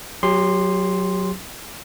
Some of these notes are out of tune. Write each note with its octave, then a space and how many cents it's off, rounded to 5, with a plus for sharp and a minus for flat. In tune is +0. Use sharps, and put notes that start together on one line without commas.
F#3 +0 G4 +35 C6 +0